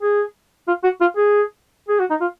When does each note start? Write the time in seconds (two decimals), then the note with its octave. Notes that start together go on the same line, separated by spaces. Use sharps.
0.02 G#4
0.68 F4
0.84 F#4
1.01 F4
1.17 G#4
1.89 G#4
2.00 F#4
2.10 D#4
2.21 F4